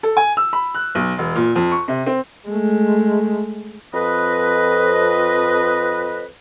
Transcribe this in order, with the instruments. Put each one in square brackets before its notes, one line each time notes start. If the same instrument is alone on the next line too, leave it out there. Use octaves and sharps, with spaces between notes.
[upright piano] A4
G#5
E6
B5
F#6
B1
E1
A#2
F2
C#6
C3
C4
[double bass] G#3 A3
[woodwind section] F2 B4 D#5